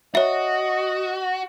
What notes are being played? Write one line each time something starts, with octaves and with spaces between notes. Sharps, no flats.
F#4 C#5 D#5 E5